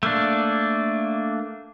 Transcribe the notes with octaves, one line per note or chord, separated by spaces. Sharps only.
A3 A#3 D4